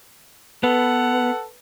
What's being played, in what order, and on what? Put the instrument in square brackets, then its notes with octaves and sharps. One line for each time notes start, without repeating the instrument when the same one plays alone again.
[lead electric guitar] B3 [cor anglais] A4 [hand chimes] B4 [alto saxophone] F#5